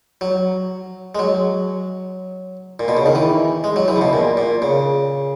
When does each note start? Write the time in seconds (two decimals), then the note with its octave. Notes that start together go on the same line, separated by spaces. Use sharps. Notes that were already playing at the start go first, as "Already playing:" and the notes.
0.21 F#3
1.15 G#3
1.19 F#3
2.79 A#2
2.88 B2
2.97 C#3
3.06 D#3
3.15 E3
3.64 G#3
3.76 F#3
3.88 E3
3.96 C#3
4.01 B2
4.13 A#2
4.37 A#2
4.62 C#3